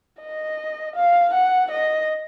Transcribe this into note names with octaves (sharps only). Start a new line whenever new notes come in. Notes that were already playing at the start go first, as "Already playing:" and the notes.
D#5
F5
F#5
D#5